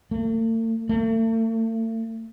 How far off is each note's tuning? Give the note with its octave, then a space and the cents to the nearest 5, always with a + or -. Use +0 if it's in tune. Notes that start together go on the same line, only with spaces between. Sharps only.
A3 +45
A3 +40